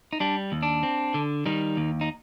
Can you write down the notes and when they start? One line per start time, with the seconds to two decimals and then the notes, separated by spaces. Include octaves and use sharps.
0.13 D#4
0.20 G3 D4
0.52 D#2
0.63 D4
0.83 C4
1.14 D3
1.46 D#3 G3 D#4
1.77 D#2
2.01 D#4